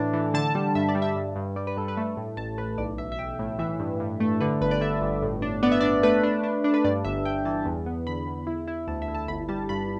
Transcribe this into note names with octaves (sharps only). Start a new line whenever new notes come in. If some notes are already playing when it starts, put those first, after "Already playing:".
Already playing: A2 E3 D4 A5
E3
D3 A5
G3
G2 E5
D5
G3
E5
G2
G2
G3 D5
B4
G2 A4
B4
A3
A2
A1 A5
A1 B4
B1 D5
B1 E5
E5
B1 G5
A2
E3 E5
G2
G2
A3
D3 B4
G1 B4
D5
D3 E5
G1
A2
D4
B3 D5
E5
D4 D5
A3 B4
D4
D4
D4
B4
G2 D5
G1 E5
G1 G5
E3 A5
E2
B3
D3 B5
E2
E4
E4
D2 A5
E5
E4
A5
G1 B5
G3 A5
G2 B5